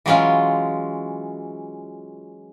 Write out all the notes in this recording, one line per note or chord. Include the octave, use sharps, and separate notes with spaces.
E3 F#3 G#3 C#4 F4